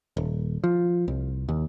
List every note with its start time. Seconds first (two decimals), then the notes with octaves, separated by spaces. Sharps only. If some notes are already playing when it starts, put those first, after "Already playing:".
0.17 D#1
0.64 F3
1.08 C2
1.49 D#2